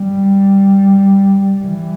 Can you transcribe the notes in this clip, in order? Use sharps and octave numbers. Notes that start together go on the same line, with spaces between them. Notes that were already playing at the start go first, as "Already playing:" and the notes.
Already playing: G3
E3